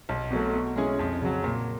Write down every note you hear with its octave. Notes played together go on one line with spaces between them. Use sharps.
B1
B2 F#3 A3
B2
G#3 C#4 E4 G#4
F2
C#3 F#3
A#2